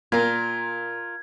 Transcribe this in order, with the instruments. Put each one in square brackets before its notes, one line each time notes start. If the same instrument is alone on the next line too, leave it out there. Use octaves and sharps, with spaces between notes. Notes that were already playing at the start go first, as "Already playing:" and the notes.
[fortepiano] A#2 [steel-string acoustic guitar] F4 A#4 [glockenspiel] G#6